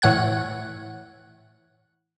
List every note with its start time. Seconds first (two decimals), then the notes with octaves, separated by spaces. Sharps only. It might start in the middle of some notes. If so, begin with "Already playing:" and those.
0.02 A2 E3 F#5 F#6 G#6